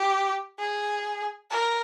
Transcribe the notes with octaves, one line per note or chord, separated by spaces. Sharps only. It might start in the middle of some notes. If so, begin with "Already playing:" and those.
Already playing: G4
G#4
A#4